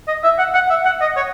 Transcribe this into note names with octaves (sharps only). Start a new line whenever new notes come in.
D#5
E5
F#5
F#5
E5
F#5
D#5
C#5